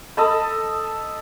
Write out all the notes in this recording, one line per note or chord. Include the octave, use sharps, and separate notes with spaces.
A4 D#5 A5 B5